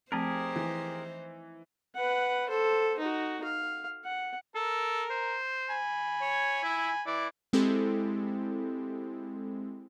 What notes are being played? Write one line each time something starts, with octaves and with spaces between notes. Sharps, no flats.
F3 A3 C4 D#4 G4 G#4 A#4 C5
E3
B4 F#5
A4 C5
D#4 F#4
F5
F#5
A4 A#4
C5
G#5 B5
C#5
E4
E3 E4 D5
G#3 C4 E4 G4 A4